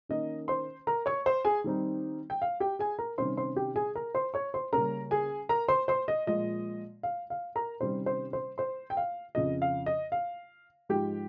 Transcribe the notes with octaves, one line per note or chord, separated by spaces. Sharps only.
D#3 A#3 C#4 D#5
C5 C6
A#4 A#5
C#5 C#6
C5 C6
G#4 G#5
D#3 G3 C4 D#4
G5
F5
G4 G5
G#4 G#5
A#4 A#5
C3 D#3 G3 C#4 C5 C6
C5 C6
G4 G5
G#4 G#5
A#4 A#5
C5 C6
C#5 C#6
C5 C6
C#3 G3 A#3 C#4 A#4 A#5
G#4 G#5
A#4 A#5
C5 C6
C5 C6
D#5
A#2 F3 G#3 D#5
F5
F5
A#4 A#5
C3 D#3 G3 C#4 C5 C6
C5 C6
C5 C6
C5 C6
G5
F5
F2 C#3 F3 D#5
F5
D#5
F5
G#2 F3 G#3 G4 G5